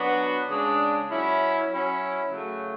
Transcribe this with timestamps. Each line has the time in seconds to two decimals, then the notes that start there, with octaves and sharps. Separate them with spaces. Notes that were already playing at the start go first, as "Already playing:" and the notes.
Already playing: F#3 B3 D4 F#4
0.49 C#3 G#3 D4
1.09 F#3 C#4 E4
1.68 F#3 C#4 E4
2.29 C#3 F#3 A3